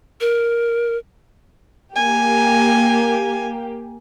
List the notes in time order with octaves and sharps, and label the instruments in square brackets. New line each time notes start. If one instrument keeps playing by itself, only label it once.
[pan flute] A#4
[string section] A#3 G4 [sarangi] G#5